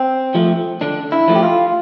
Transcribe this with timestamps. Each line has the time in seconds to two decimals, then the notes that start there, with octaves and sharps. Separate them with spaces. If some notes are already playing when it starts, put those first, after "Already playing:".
Already playing: C4
0.35 F3 A3
0.81 D3 D4
1.12 E4
1.28 F3 A3
1.35 G4
1.43 F4